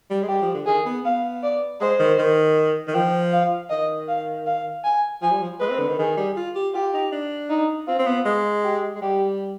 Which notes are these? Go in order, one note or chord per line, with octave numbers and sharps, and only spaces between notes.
G3
G#3
G3 G4
F3
D3
D#3 G#4
B3
B3 F5
D5
G#3 C5
D#3
D#3
D#3
F3 G5
F5
D#3 D#5
F5
F5
G#5
F3 G#5
G3
F3
G#3 B4
C4
D3
D#3
D#3 G#4
G3
F4
G4
F4 G4
D#4
D4
D#4
C4 F4
C4
B3
G#3
G4
G#3
G3 G4